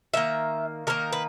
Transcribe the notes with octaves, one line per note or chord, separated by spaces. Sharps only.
D#3 A#3 E5
D#3 A#3 A#4
B4